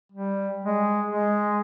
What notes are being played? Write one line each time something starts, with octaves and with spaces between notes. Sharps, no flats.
G3
G#3
G#3